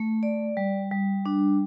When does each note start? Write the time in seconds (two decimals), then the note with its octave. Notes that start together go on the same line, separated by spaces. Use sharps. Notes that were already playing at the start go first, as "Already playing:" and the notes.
Already playing: A3
0.23 D5
0.57 G3
0.91 G3
1.26 D4